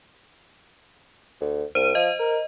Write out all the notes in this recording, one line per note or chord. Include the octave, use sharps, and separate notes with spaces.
D2
C2 C5 D#7
F3 D#5
A#4